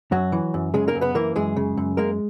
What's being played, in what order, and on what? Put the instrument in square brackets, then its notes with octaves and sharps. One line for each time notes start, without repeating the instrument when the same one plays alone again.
[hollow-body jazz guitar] F#2 F#3 F#4
E3
F#2
C#3 G#3 G#4
A#3 A#4
F#2
B3 B4
E3 A#3 A#4
F#2 G#3 G#4
C#3
F#2
G#3 A#3 A#4